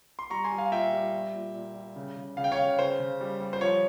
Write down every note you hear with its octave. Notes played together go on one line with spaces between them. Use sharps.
C6
G3 A#5 C#6
G#5 C6
G3
F5 G#5
A#2 E5 G5
G3
G3
A#2
A#2
G3
C#3
C#3
C#3 F5
G5
C#5 F5
C#3
C#3 C5
C#3
G3
G3
C5
F3 C#5